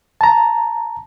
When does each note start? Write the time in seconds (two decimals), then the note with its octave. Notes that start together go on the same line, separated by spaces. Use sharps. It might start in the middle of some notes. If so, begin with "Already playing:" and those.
0.21 A5 A#5